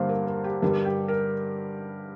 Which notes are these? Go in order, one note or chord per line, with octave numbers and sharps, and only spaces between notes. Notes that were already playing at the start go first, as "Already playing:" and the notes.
Already playing: G2 D3 G3 A#3 C5 F5
A#4
A#4
G4
G2 D3 G3 A#4
G4
A#4